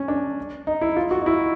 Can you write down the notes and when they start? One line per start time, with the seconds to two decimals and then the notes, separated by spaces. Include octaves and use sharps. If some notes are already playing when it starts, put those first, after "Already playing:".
Already playing: C#4
0.08 D4
0.67 D#4
0.81 E4
0.97 F4
1.11 F#4
1.21 D#4
1.26 E4